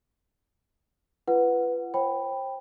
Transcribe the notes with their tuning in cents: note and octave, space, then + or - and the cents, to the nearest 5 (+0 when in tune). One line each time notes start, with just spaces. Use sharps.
F4 -40 B4 +0 F#5 +0
C5 +40 G5 +10 B5 +0